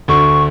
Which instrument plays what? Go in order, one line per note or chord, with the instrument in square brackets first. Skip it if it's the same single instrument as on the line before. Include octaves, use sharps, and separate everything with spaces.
[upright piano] D2 D3 [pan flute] C#6